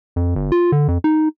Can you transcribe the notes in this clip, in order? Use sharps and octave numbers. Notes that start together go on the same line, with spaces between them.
F2
G1
F4
D3
F2
D#4